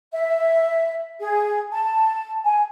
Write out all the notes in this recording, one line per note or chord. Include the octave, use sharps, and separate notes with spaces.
E5
G#4
A5
G#5